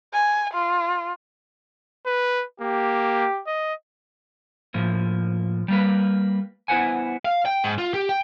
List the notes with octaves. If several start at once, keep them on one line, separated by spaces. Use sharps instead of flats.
G#5
F4
B4
A#3 G4
D#5
A2 F3 A#3
G3 A#3 B4
B3 E4 B4 C5 F#5 G#5
F5
G5
G#2
F4
G4
G5